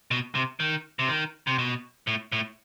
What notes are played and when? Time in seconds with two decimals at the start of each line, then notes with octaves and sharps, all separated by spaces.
0.11 B2
0.35 C3
0.60 D#3
0.99 C3
1.08 D#3
1.47 C3
1.58 B2
2.07 A2
2.32 A2